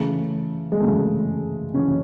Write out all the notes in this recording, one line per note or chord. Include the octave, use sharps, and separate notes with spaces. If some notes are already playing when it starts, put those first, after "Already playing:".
Already playing: C#3 E3 A3
G#3
C#3 E3 A3
C#3 E3 C#4